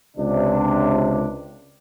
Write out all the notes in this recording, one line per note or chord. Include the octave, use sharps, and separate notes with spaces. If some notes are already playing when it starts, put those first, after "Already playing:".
C#2 C3 D4